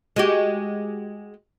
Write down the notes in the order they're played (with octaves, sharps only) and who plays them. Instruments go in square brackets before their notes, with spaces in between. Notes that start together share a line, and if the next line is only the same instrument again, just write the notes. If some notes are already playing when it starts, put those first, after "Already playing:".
[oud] G#3 F#4 G4